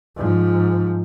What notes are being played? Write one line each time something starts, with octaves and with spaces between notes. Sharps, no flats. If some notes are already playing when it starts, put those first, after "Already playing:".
G#2 F3